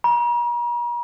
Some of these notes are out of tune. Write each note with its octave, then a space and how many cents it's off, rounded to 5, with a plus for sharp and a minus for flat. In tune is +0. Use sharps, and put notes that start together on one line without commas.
A#5 +45